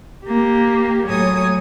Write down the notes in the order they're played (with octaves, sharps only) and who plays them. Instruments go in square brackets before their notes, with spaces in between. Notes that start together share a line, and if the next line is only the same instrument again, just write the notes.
[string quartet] A#3 G4
A2 F#3 C#5 G#5 D#6